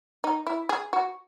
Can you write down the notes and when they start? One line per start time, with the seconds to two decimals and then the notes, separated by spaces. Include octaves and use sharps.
0.24 D#4
0.47 E4
0.69 G#4
0.93 F#4